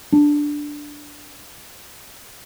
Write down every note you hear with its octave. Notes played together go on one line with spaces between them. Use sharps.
D4